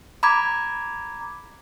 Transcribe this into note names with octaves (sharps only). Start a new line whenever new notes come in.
A#5 B5 D6 G#6